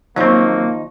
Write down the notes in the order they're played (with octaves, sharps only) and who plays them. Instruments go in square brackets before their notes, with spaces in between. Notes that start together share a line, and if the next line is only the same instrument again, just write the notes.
[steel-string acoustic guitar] D#2 F3 D#4 [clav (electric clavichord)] F#3 C4 [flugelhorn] A#3 [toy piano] F5 C#6